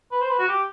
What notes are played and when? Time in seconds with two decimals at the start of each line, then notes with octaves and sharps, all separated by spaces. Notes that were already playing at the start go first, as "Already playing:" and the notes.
0.12 B4
0.21 C5
0.30 B4
0.39 F#4
0.48 G4